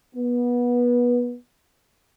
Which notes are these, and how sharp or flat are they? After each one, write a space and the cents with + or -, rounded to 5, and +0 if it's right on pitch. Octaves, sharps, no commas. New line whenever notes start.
B3 -25